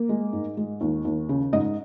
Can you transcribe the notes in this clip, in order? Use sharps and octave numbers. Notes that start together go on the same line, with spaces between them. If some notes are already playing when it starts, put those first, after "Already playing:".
Already playing: A#3
G#3
G#2
G#3
D#2
D#2
C#3
G#2 D#5